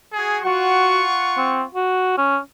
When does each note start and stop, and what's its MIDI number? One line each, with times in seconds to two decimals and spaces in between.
0.13 0.41 66
0.13 0.41 68
0.45 1.69 65
0.45 1.02 66
0.45 1.69 78
0.45 1.69 85
1.37 1.62 60
1.74 2.16 66
2.17 2.38 61